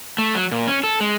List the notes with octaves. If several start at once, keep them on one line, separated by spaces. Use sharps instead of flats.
A3
F#3
A#2
C#4
A4
G#3